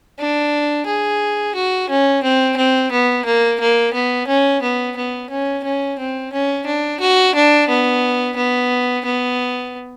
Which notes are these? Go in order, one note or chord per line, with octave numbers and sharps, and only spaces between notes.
D4
G#4
F#4
C#4
C4
C4
B3
A#3
A#3
B3
C#4
B3
B3
C#4
C#4
C4
C#4
D4
F#4
D4
B3
B3
B3